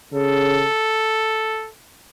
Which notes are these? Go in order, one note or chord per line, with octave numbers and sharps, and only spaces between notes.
C#3 A4